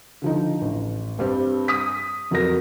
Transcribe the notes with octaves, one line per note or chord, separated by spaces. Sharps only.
D3 F3 D#4
A1
G2 G3 C4
D#6 B6
F2 F#3 F#4 A#4 A#6